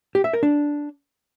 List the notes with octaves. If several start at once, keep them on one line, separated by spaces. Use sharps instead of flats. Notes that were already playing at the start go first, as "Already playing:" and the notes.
G4
E5
A#4
D4